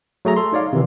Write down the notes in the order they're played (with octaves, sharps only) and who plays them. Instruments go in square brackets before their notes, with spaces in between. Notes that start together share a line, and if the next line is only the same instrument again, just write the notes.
[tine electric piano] F#3 A3 G#4 A#5
A4 C6
D#4 C#5 D5 F5
C3 D#3 E3